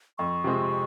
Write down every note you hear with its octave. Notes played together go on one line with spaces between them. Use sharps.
F2 C#6
C3 F3 G#3 C4